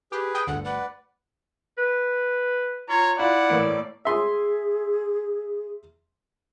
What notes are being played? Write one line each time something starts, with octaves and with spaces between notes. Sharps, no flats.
G4 G#4 B4
G5 D#6
G1 D2 A4 F#5
B4 D5 F#5
B4
F4 C#5 A#5
E4 F4 D5 F#5
A2 E3 A#3
G#4 E5 C6 D#6